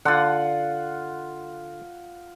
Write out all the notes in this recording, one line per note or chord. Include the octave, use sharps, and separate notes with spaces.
D3 F4 F#5